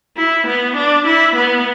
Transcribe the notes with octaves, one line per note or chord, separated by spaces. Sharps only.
E4
B3
D4
E4
B3